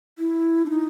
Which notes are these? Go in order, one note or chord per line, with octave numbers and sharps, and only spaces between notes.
E4
D4
D#4